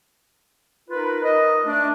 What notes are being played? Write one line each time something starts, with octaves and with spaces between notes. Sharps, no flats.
D#4 F4 A#4 B4
A#4 D#5
A3 D4